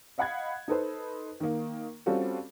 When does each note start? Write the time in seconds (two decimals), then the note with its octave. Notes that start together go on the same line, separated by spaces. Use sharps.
0.18 D#5 F5 F#5 B5 F#6 G#6
0.68 D#4 A4 B4 C5
1.40 D#3 A#3
2.06 G3 C4 C#4 F4 F#4 A4